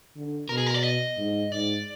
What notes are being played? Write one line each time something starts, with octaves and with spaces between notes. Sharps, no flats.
D3
B2 A#4
G#4
A#4
D5
D#5
G#2
G#2 D5